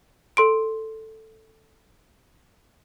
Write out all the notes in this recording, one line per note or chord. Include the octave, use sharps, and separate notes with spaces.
A4 C6 D7